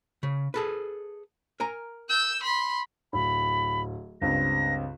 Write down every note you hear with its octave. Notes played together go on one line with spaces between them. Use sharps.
C#3
G#4 A4 B4
A#4 G#5 A#5
E6 G6
B5 C6
D1 B5
C#2 G2 C4 A#6